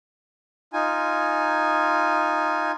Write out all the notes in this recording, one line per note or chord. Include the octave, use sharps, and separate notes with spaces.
D#4 F4 G#5